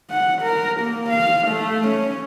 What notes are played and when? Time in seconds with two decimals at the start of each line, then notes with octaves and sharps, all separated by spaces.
0.10 F#5
0.42 A#4
0.81 A#3
1.09 F5
1.47 A3
1.88 C#4